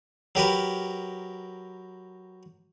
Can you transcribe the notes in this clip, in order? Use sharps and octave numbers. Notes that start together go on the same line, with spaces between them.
F#3 G4 A#4 B4